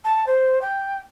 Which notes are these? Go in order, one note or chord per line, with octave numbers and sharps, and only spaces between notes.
A5
C5
G5